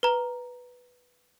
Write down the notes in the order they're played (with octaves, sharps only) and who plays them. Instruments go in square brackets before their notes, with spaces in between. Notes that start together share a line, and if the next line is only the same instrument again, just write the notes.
[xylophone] B4 A#5